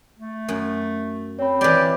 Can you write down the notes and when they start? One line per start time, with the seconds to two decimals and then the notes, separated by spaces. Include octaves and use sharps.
0.19 A3
0.48 F#2
1.39 C4 C#5 B5
1.61 E3 C4 G4 D5